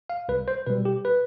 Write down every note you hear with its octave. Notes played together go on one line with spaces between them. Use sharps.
F5
C2 B4
C5
B2 G3 B4
G4
B4